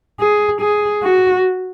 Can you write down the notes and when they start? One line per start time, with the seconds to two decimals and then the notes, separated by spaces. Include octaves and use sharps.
0.20 G#4
0.61 G#4
1.03 F#4